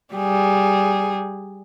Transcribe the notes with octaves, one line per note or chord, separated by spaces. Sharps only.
G3 G#4